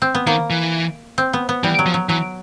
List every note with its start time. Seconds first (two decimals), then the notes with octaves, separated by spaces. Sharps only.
0.02 C4
0.15 B3
0.27 D#3 A#3
0.50 E3
1.18 C4
1.33 B3
1.49 B3
1.64 E3 G3
1.79 F#3
1.86 F3
1.94 F#3
2.09 E3 F#3